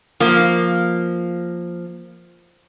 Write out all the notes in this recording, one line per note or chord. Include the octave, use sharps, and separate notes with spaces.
F3 A#3